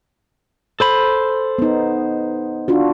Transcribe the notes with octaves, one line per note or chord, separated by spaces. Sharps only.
A4 C5 B5
B3 D#4
D4 F4 F#4